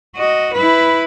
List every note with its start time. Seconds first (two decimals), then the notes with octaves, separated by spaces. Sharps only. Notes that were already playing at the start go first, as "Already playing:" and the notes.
0.16 F#4 D#5
0.54 E4 B4